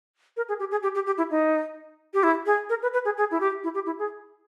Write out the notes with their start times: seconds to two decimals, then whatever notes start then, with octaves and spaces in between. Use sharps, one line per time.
0.37 A#4
0.49 G#4
0.59 G4
0.71 G#4
0.83 G4
0.95 G4
1.06 G4
1.18 E4
1.31 D#4
2.14 G4
2.23 E4
2.46 G#4
2.70 A#4
2.82 B4
2.93 B4
3.05 G#4
3.17 G#4
3.31 E4
3.40 G4
3.64 E4
3.75 G4
3.86 E4
3.99 G#4